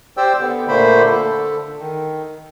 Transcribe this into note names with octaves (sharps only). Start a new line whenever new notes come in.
G4 C5 D5 G5 E6
D3 B3
A#2 D3 A3 A#3 C5 B5
D3 A4
D#3